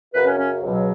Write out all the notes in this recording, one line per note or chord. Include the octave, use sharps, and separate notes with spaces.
F#2 C#3 F#3 B4
C#4
C#4
C#2 B2 F#3